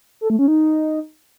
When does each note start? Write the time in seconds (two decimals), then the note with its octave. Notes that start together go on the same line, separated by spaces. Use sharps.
0.21 A4
0.30 A3
0.39 C#4
0.48 D#4